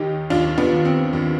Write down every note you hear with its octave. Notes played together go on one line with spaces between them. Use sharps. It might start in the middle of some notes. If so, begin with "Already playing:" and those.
Already playing: D#2 D#3 D#4 G4
D#2 D4 F4
B3 D4
D#3
C4
D#2